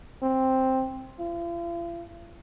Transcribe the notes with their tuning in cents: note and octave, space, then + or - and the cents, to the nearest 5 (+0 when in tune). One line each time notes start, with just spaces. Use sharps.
C4 +5
F4 -45